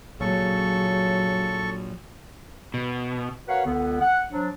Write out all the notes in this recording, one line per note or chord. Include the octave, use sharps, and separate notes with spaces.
A#1 C#3 F#3 A4 C#6
B2
F#4 A#4 B4 C#5 F5 F#5
C#2 D3 B3
F#5
F3 F#3 D4